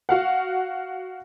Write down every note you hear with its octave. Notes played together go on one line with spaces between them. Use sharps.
F#4 F5 F#5